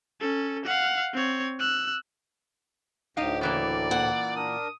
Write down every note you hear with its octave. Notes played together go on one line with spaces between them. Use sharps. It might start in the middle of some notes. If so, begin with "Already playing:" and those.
C#4 A4
F5 F#5
C4 C#5
E6 F#6
D2 A2 D#4 G4 F5
C#3 E3 A#3 D5
A#2 F#5
D4 A#4 D#6